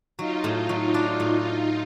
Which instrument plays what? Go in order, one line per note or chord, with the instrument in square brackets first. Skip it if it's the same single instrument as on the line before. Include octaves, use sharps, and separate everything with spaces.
[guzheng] F#3 [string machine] D#4 F4
[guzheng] A2
F#3
D4
A2